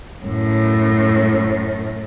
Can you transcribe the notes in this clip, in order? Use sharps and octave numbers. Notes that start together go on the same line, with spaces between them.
F#2 A2